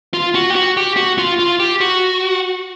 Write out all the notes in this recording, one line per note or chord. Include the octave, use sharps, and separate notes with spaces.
F4
F#4
G4
F#4
G4
F#4
F4
F4
G4
F#4